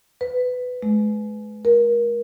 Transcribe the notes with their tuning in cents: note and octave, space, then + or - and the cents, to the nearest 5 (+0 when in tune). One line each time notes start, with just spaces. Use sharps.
B4 +15
G#3 +35
A#4 +25